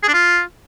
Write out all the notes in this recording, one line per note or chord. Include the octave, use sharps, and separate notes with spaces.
G#4
D4
F4